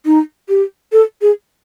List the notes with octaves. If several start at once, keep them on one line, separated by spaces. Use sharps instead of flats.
D#4
G4
A4
G#4